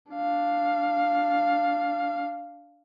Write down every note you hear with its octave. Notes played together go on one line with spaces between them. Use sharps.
D4 F5